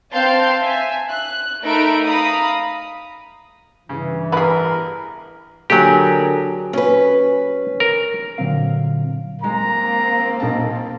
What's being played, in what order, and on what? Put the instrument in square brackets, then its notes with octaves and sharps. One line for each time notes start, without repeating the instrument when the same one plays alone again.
[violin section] C4 F5 A5 C6 G6
E5 G#5
F#6
A3 D#4 A#4 E5 B5 D7
F5 A#5 B5 D#6
[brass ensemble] G2 E3 [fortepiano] C#3
[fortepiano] A1 B5 [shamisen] B3 G#4 [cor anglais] A#4
[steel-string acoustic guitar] D3 G#4 A#4 [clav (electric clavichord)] F#3 G4
[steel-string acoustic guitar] C#4 B4
[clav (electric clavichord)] A#4
[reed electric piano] A#2 D3 F#3 C4 F5
[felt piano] G#3 [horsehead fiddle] A#3 C4 [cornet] A#5
[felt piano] B1 A5